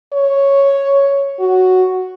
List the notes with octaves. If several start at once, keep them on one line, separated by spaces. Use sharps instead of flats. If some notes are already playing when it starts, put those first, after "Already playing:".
C#5
F#4